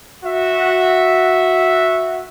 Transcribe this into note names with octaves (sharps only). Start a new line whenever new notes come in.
F#4 E5